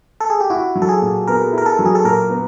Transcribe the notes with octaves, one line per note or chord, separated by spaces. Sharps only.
A4
G#4
G4
E4 F#4
F#3
A4
G#4
A#2
B3 A#4
E4
A#4
A4
F#3
G#4
A4
A#2 A#4
B3